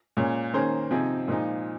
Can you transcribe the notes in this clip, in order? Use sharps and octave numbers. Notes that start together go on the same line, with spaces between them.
A#2 G#3 C#4
D#3 A#3 C#4 G#4 C5
C3 F3 C4 D#4 G#4
A#2 F3 G#3 D#4